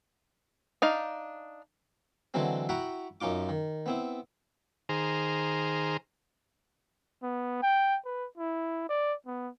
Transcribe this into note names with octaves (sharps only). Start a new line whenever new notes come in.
D4 D#4 F5
D3 E3 F#3 G#3 C4
E4 F#4 F#5 G5 A#5 B5
F#2 C#4 D#4 F4 D6
D#3
B3 C4 E4
D#3 G#4 C5 A#5 F6
B3
G5
B4
E4
D5
B3